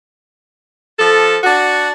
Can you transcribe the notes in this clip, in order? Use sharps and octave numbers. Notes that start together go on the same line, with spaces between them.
F3 A4
D4 F#4